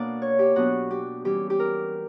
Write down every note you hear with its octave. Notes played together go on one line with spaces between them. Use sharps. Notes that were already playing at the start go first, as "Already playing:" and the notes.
Already playing: B2 A#3 D4 D5
C#5
G4
B2 F#3 B3 D4 F#4
G4
E3 G3 C#4 G4
G4
A#4